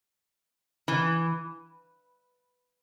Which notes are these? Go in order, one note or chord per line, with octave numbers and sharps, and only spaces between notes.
E3